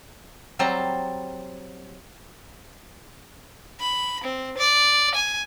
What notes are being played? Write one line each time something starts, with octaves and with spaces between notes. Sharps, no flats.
F#3 G3 C4 C5 A5 A#5
B5
C4
D5
G#5